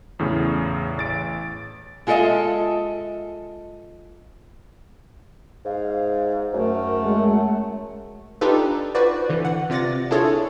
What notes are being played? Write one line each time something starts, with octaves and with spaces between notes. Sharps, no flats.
E2 A2 C#3
A1 A6 D7
G#3 F4 A4 B4 D#5 E5
G#2 F5
F#2 A3 A#4
G#3 F#5
D4 D#4 F4 G4 A4 B4
F4 F#4 B4 C5 D5
D3 E3
F#5
C3 F4 D5 A6 A#6
D4 E4 F4 G#4 A4 C#5